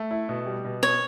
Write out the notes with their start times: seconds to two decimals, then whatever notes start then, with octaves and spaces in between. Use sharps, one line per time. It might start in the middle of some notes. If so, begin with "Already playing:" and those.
Already playing: A3
0.11 E4
0.29 B2
0.46 G3
0.65 B2
0.82 B3 C#5